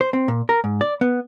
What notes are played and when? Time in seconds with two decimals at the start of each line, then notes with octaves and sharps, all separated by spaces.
0.01 C5
0.13 C4
0.28 A#2
0.49 A#4
0.64 G#2
0.81 D5
1.01 B3